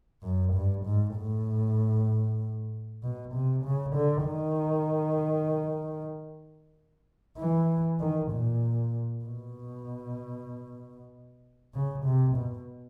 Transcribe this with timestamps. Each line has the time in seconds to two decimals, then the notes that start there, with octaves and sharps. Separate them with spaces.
0.23 F#2
0.53 G2
0.85 G#2
1.16 A2
3.03 B2
3.34 C3
3.64 C#3
3.95 D3
4.27 D#3
7.38 E3
8.00 D#3
8.31 A#2
9.25 B2
11.74 C#3
12.05 C3
12.36 B2